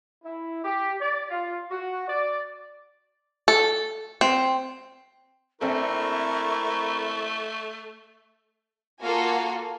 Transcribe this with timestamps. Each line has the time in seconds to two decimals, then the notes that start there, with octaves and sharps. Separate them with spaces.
0.24 E4
0.64 G4
1.01 D5
1.30 F4
1.71 F#4
2.07 D5
3.48 A4
4.21 C4
5.61 A#1 A3 C4 E4 A4 A#4 C#6
9.01 A#3 F4 F#4 A4 F5 G#5